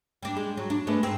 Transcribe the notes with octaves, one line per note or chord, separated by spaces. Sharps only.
G3 D4
G#3
F#3
D4
G#3 A3 B3
G#2 C4